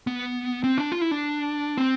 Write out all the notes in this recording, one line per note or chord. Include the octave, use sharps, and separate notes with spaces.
B3
C4
D4
F4
E4
D4
C4